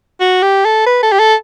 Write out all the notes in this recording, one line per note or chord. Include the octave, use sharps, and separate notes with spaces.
F#4
G4
A4
B4
A4
G4
A4